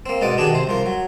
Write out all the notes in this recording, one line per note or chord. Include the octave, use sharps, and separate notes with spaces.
A#3 C4
G#2 B2 D5 D#5 D6
B2 D#3 D4 G4 G#4
C3 C5
C2 F3 A#4
F#3